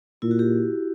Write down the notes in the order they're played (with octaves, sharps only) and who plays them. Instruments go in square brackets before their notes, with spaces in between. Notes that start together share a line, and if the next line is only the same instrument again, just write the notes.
[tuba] A#2 [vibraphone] E4
[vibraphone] F#4
G4